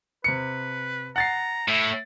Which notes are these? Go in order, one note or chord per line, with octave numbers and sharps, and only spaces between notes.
C3 B4 C#7
F#5 A#5 A6 C7
A2 E5